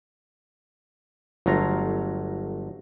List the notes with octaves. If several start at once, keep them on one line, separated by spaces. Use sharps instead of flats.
G1 F#3 A3 F4 A#5